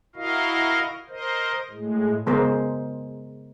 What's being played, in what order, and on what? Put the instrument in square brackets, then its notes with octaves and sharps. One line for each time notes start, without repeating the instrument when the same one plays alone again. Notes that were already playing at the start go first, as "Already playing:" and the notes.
[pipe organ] E4 F#4 A#4 D#5 F5
A#4 C5 D#5
A2 G#3
[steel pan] C#3 G#3 B3 A#4 C5